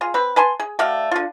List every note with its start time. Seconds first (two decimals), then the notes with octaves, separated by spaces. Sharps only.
0.01 F4 G#4
0.14 C4 B4
0.36 B4 G#5 A5 C6
0.60 G#4
0.79 A3 F#4 D5 F5
1.11 D3 F4